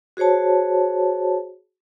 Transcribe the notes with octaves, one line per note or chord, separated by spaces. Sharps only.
F#4 G#4 C5 C#5 A5